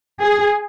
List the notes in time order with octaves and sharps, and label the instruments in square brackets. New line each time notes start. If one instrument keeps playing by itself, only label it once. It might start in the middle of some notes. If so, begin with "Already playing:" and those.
[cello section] G#4